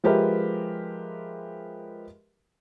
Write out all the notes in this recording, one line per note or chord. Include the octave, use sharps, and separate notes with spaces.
F3 G#3 G4 A#4 B4 E5